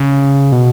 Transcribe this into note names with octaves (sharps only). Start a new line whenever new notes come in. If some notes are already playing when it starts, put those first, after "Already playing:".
Already playing: C#3
B2